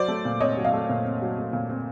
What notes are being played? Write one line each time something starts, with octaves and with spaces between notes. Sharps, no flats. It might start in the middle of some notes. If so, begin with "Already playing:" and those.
Already playing: F#3 C5 D5
A3
A#2
C4 C#5 D#5
F#3
D#5 F5
A3
A#2
C4
F#3
A3
A#2
C4